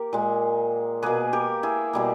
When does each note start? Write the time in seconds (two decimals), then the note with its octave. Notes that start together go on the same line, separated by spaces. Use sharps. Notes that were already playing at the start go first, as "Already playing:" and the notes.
Already playing: A#3 G4 A#4
0.13 A#2 G#3
1.02 B2 A#3 G#4 B4
1.33 G4 A#4
1.63 E4 G#4
1.93 B2 G3 A#3